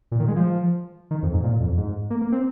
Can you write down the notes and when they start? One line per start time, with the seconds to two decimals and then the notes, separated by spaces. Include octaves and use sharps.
0.12 A#2
0.20 D#3
0.28 G#3
0.36 F3
1.11 D#3
1.23 F2
1.33 G#2
1.44 A#2
1.61 F2
1.77 G#2
2.10 A#3
2.22 A#3
2.32 C4